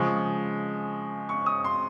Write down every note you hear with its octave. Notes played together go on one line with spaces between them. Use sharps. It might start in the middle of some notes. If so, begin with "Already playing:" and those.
Already playing: C#3 F3 G#3 C#6
C#6
D#6
C6